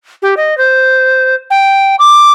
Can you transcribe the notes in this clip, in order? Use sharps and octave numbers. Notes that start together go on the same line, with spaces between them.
G4
D#5
C5
G5
D6